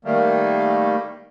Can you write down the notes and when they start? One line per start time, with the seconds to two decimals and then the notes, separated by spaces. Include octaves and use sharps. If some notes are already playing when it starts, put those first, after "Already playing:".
0.05 D#3 G3 A3 A#3